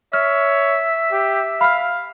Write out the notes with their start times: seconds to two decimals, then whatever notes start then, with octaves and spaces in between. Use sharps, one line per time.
0.13 C#5 E5 F6
1.12 G4
1.61 F5 B5 F6